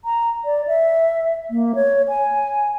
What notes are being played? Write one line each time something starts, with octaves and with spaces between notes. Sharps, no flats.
A#5
D5
E5
A#3
C#5
G#5